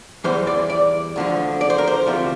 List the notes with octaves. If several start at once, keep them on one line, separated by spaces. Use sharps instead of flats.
E2 E3 G3 C5
D5
D5
D2 D3 F3
D5
C5
A#4
C5
D2 C3 F3